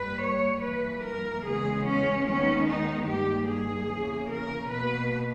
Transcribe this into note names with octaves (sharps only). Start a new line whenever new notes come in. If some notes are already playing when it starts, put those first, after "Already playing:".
Already playing: G2 G3 A#3 B4
C#5
G2 E3 A#3 B4
A#4
E2 C#3 G#3 B3 G#4
C#4
D#2 D#3 G#3 B3 C#4
D#4
G2 D#3 A#3 G4
G#4
E2 C#3 E3 A#3
A#4
B2 A#3 B4